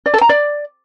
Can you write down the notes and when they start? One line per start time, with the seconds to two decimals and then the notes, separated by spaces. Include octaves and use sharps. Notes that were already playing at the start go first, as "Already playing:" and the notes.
0.06 D5
0.14 A4
0.21 A#5
0.29 D5